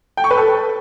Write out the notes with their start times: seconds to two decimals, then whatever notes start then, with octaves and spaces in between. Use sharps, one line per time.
0.17 G5
0.24 C#6
0.31 B4
0.37 A4